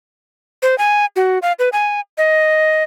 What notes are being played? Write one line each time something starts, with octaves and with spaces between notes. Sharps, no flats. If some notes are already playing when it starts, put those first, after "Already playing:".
C5
G#5
F#4
F5
B4
G#5
D#5